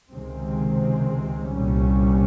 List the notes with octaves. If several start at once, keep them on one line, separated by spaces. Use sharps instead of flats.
C#2 C3 D#3 G#3 C4
C2 A#2 G3 C#4